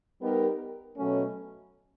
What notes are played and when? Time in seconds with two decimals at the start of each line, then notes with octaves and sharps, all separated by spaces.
0.21 G3 B3 D#4 G4 A#4
0.96 B2 F#3 A3 C#4